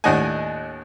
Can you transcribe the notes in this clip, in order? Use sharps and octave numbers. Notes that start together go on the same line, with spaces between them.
D#2 A2 D4 D#5 F#5 G#5